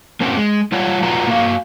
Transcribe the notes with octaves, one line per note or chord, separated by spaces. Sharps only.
A#3 C4 C#4 F#4
G#3
G3 F4 C#5 D5 F#5
F4 F#4 B4 D5 F#5 A#5
A#3 F#4 F5